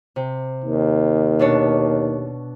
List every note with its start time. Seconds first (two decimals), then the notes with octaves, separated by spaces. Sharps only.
0.16 C3
0.64 D#2
1.39 B2 D4 C#5